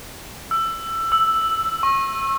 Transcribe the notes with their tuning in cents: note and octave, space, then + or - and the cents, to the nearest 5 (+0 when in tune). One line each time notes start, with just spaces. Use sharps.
E6 +20
E6 +0
C#6 -35